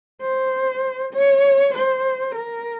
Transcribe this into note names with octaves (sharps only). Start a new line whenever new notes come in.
C5
C#5
C5
A#4